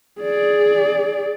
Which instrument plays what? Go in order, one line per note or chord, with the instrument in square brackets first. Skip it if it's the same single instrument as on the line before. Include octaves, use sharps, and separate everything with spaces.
[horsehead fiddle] G#4 D5